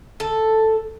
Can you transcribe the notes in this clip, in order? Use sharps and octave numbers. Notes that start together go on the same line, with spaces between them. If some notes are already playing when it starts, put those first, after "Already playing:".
A4